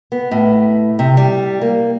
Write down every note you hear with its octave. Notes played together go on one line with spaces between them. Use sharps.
B3
A2
C3
G3
A#3